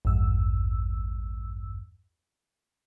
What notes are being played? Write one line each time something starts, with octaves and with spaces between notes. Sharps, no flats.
A1 E2 G2 E6